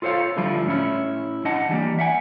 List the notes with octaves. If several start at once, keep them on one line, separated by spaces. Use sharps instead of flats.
F4 A4 C5 C#5 F5
D3 F3 G3 D4 E4 F4
A2 C#4 E4
D4 D#5 F#5 A5
E3 G3 A#3
E5 F#5 G#5